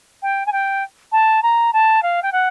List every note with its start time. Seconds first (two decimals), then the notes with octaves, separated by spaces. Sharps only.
0.22 G5
0.46 G#5
0.52 G5
1.12 A5
1.42 A#5
1.73 A5
2.02 F5
2.22 G5
2.32 F#5